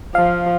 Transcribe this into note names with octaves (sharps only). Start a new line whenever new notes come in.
F3 F5